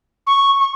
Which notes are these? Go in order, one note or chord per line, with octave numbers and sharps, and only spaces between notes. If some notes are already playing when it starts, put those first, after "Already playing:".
C#6
C#6